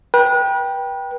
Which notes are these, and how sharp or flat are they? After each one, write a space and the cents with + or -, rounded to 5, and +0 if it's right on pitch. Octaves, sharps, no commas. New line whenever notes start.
B4 -35 G5 +0